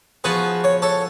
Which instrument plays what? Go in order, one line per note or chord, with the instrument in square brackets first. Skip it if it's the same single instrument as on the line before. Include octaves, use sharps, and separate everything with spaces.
[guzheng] F3 B3 F#4 [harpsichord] G#4 B4
[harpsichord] C#5
A4 C#5